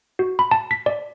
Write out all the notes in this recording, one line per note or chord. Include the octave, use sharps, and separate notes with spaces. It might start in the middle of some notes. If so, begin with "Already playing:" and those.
F#4
B5
A5
B6
D5